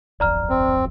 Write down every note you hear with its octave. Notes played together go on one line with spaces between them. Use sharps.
D1 G1 F2 D5 A#5 F6
C4